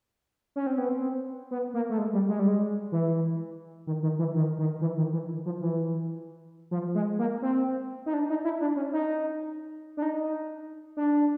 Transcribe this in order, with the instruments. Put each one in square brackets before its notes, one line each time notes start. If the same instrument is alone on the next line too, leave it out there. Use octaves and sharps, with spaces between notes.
[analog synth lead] C#4
C4
B3
C4
B3
A#3
A3
G#3
G3
G#3
G3
G#3
E3
D#3
D#3
E3
D#3
D#3
E3
D#3
E3
F3
E3
F3
G#3
A#3
C4
D#4
D4
D#4
E4
D4
C#4
D#4
D4
D#4
D4